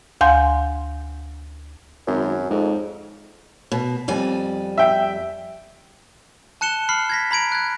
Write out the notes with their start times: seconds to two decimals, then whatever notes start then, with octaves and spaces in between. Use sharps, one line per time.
0.21 D2 F5 G#5 C6 G6
2.07 G#1 F#2
2.50 F2 G#2
3.72 B2
4.08 F2 G3 G#5
4.78 E5 G5
6.61 A5 F#6 C#7 E7 G7
6.89 B5 F6 C7
7.10 G#6 A#6 B6
7.31 A#5 B5 G#6 D7
7.52 F#6 G#6